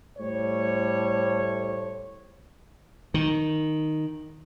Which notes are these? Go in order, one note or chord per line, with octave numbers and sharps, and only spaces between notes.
A2 G3 A3 C5 C#5
D#3